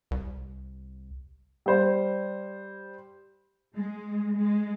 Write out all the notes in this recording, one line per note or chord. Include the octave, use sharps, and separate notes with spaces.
C2
G3 C5
G#3
G#3